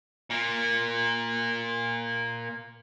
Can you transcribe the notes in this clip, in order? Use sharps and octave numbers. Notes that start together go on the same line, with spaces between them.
A#2 A#3